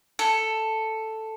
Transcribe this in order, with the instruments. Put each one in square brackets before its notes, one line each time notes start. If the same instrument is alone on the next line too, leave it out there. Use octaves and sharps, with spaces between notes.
[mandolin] A4